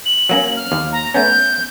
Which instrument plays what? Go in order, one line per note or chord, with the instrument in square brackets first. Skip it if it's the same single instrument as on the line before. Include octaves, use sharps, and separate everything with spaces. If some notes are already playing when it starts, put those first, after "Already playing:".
[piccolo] F#7
[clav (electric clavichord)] F#3 A#3 C#4
[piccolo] F6
[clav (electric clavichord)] D#2
[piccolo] A#5
[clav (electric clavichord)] A3 B3 C#4 [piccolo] G6